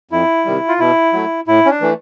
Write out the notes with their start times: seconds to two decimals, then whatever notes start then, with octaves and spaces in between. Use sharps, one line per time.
0.11 F2 E4
0.45 C3 D#3 G3
0.68 F4
0.79 B2 E4
1.13 F#3 A3
1.47 A2 E4
1.65 C#4
1.70 D4
1.81 E3 A3